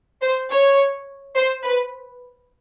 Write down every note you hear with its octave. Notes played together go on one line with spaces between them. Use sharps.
C5
C#5
C5
B4